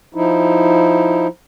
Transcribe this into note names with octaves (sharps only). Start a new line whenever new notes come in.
F3 D#4 E4